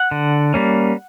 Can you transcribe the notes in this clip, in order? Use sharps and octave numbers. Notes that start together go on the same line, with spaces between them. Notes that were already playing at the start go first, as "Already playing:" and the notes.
Already playing: F#5
D3
G3 A#3 C#4